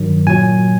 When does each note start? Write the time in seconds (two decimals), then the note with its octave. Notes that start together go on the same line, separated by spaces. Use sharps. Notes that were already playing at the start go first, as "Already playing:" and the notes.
Already playing: G2 D#3 F#3
0.27 A#2 F#3 G#5